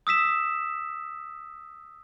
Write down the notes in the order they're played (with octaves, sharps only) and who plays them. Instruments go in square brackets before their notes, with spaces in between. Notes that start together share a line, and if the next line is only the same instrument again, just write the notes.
[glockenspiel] D#6 E6 B6 E7